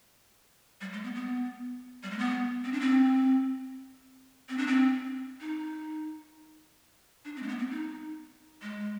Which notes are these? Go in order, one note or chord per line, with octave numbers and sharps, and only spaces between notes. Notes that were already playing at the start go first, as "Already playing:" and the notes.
G3
G#3
B3
B3
G3
G#3
B3
C4
D4
C4
C4
D4
C4
D#4
D4
C4
G#3
B3
C4
D#4
G#3